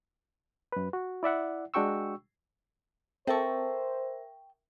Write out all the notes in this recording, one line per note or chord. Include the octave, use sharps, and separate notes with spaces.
F#2 B4
F#4
E4 D5 E5 F#5
G#3 D4 F#4 G5 C#6 E6
C4 A4 A#4 C5 E5 G5 A5 C#6